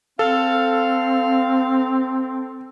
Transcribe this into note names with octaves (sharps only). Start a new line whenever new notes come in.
C4 A4 F5